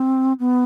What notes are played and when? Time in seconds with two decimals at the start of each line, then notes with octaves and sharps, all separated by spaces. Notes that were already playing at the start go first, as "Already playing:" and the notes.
Already playing: C4
0.40 B3